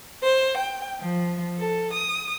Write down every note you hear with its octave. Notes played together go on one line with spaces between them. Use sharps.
C5
G5
F3
A4
D#6